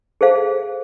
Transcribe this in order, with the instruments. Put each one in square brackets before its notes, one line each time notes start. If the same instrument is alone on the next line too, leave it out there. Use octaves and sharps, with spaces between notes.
[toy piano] G#4 A4 C5 F5